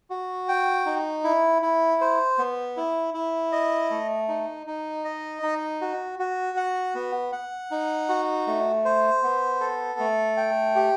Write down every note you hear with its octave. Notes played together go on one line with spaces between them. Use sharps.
F#4
G5
D#4
E4
E4
C5
B3
E4
E4
D#5
A3
D#4
D#4
D#5
D#4
F#4
F#4
F#5
B3
F#5
D#4
F#4
A3
C5
B3
A4
A3
G5
G4